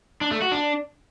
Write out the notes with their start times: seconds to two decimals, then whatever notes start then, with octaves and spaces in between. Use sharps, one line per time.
0.21 D4
0.31 A3
0.42 F#4
0.52 D4